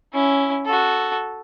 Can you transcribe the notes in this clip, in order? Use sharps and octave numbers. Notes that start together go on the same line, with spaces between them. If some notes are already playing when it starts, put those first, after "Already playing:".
C#4 E4
F#4 A4